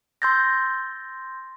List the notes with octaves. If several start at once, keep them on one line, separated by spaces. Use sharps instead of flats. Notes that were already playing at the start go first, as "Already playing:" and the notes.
C6 E6 G6 A6 A#6